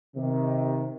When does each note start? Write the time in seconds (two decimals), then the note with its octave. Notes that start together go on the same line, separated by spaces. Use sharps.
0.16 C3 D#3